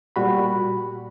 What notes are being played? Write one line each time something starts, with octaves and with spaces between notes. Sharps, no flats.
A#2 G3 F#4 B5